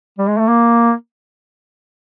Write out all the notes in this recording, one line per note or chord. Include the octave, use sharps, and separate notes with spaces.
G3
G#3
A3
A#3